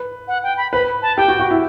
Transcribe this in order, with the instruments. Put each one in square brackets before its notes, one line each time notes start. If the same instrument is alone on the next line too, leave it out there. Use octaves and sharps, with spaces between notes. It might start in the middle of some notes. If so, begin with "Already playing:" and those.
Already playing: [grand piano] B4
[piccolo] F#5
G5
B5
[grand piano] B4 [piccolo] B5
[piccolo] A5
[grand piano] G4 [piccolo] G5
[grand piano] F#4
F#4
E4